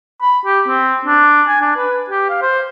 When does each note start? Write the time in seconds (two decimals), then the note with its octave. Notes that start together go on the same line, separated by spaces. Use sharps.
0.22 B5
0.46 G4
0.68 C4
1.06 D4
1.48 G#5
1.62 D4
1.77 B4
2.10 G4
2.30 F5
2.42 C5